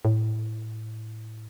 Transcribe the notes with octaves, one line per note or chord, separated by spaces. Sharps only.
A2